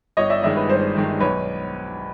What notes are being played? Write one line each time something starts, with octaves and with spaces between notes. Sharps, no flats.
G1 C#5 D#5
D5 E5
G2 D#3 G#3 D5 E5
B4
G1 C5
G2 D#3 G#3
B1 B4 C#5